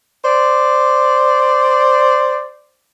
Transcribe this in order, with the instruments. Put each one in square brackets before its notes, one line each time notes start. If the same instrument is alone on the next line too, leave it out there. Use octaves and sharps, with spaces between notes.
[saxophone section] C5 D5